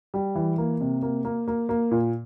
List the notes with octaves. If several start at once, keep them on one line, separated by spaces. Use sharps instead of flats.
G3
E3
A#3
C3
A#3
A#3
A#3
A#3
A#2